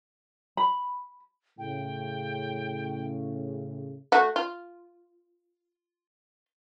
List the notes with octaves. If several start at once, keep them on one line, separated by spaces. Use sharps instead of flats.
B5
A2 C#3 G5
A3 F#4
F4